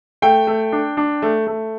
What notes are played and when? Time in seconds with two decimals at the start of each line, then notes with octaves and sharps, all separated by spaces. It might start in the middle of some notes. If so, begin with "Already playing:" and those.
0.22 A3 G5
0.47 A3
0.72 D4
0.97 D4
1.22 A3
1.47 A3